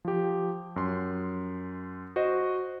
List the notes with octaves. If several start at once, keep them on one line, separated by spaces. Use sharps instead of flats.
F3 G4
F#2 C6
F#4 C5 D#5